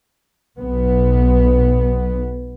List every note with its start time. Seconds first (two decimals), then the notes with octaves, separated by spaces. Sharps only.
0.59 B1 B3